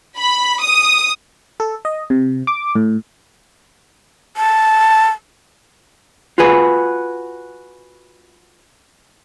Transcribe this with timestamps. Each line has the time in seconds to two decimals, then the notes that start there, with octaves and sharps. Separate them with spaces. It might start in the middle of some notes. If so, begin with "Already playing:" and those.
0.17 B5
0.61 D#6
1.60 A4
1.85 D#5
2.10 C3
2.47 D6
2.75 A2
4.37 A5
6.38 F4 F#4 G#4 B4